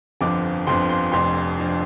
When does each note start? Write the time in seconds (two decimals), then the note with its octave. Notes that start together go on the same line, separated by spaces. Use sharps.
0.21 G1 F2 D3 F3 D6
0.67 G1 F2 D3 F3 C6
0.89 C6
1.12 F1 F2 F3 D4 C6
1.59 F3 D4